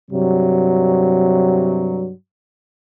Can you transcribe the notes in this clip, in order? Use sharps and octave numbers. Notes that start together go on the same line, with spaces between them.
G2 C3 F#3